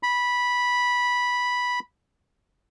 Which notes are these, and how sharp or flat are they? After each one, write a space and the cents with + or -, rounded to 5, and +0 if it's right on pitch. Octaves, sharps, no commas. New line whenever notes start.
B5 -10